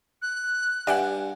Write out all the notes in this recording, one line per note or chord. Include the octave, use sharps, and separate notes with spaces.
F#6
G2 D5 E5 F#5 G#5